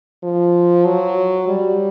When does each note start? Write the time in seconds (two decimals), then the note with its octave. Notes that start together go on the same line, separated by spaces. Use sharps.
0.23 F3
0.85 F#3
1.48 G3